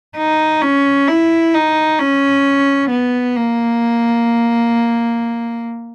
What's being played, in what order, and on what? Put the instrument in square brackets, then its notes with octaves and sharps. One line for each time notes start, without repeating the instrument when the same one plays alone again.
[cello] D#4
C#4
E4
D#4
C#4
B3
A#3